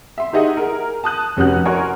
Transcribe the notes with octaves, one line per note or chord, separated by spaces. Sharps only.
E5 C6
D#4 G4 G#4 D#5 E5 F#5
G#4 A#4
A5 D#6 F#6
F1 C#4 F#4 G4 F#6
F#4 A#4 C#5 G#5 C6 C#6